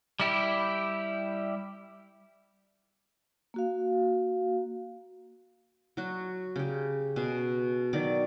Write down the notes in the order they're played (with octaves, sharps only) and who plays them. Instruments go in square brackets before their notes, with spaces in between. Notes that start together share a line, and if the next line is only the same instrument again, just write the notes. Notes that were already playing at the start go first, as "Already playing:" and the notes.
[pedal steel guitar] G3 E4 G4
[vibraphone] A#3 F#4 F5
[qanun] F#3 F#4
C#3 G4
B2 G#4
D#3 F#3 D5